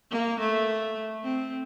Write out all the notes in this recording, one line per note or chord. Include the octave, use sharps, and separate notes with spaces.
A#3
A3
C4